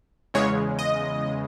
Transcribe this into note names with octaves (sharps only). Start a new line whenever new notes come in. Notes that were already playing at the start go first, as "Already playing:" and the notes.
E2 C#3 G#3 C#5
D#5